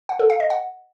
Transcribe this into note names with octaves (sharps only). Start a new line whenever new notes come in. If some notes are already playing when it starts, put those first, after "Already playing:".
F#5
A4
F5
D#5
F#5